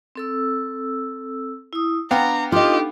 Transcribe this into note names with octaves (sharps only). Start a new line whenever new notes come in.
C4 A4 E6
E4 D#6
B3 D4 F5 G5 A#5
D4 D#4 F4 G4 A4 D#5